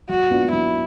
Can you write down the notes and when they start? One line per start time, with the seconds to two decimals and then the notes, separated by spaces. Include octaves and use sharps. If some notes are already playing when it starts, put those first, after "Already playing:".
0.09 F#3 F#4
0.31 B3 D4 F4
0.52 F#3 E4